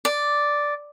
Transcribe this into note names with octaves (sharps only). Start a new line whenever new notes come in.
D5